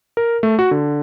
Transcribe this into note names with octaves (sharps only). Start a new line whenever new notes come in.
A#4
A3
F#4
D3